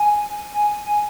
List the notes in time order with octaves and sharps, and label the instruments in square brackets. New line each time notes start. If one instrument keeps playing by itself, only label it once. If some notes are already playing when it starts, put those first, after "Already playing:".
Already playing: [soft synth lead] G#5
G#5
G#5